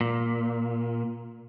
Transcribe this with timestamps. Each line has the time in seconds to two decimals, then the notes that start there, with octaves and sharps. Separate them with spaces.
0.01 A#2